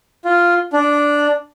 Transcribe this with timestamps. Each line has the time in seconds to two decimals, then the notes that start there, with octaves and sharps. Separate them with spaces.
0.25 F4
0.73 D4